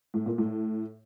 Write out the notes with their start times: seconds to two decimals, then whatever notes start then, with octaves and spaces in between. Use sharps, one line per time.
0.14 A2
0.26 A#2
0.38 A2